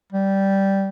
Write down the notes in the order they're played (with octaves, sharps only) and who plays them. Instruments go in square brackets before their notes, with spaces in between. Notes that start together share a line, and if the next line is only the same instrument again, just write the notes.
[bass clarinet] G3